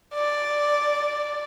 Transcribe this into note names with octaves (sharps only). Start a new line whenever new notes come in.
D5